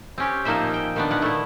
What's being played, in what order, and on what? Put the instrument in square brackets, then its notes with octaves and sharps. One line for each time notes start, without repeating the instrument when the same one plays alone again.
[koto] C4 C#4 G4
A#2 F3 A#3 D#4 C5 E5
G5
D#3 B3 D4
A#2 B3 F#5
A3 E4